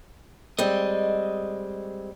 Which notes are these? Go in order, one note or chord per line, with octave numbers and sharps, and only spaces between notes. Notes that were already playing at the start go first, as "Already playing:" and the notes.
G3 G#3 C4 D#5